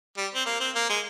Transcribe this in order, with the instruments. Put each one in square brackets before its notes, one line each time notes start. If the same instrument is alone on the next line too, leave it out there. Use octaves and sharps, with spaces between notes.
[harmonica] G3
C4
A#3
C4
A#3
G#3